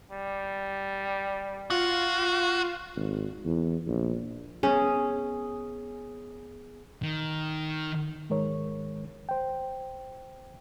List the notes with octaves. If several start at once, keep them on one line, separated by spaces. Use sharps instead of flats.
G3
F4 F#4 F5
G#1
E2
A#1
B3 C#4 G#4
D#3
G#2 D#3 G#3 A#4 C#5
C5 G5